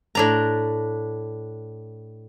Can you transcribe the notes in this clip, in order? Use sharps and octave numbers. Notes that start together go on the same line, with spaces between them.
A2 D4 A#5